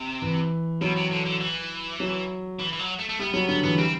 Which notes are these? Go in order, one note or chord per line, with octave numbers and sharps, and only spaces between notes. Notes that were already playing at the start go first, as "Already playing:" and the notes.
Already playing: C3
E3
B2 F#3
C3
D3
D3
E3
F#3
E3
E3
F#3
A3
A3
G3 B3
F#3 B3
D3 B3
E3 B3
G3 C4